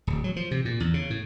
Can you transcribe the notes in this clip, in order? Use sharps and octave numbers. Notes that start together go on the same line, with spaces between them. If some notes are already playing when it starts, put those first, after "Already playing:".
D1
F#3
F3
C3
A#2
E2
C#3
A2